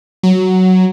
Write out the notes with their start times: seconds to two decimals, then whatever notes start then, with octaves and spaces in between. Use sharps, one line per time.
0.23 F#3